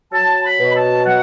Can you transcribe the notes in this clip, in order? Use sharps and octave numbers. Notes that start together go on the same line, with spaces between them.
F#3 A5
B5
B2
A5
F#3 F#5